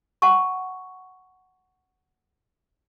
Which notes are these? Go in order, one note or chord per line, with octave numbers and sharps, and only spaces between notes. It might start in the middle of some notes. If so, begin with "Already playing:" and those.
F#5 A5 C#6